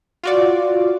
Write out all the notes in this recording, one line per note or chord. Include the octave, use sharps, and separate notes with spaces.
F4 F#4 D5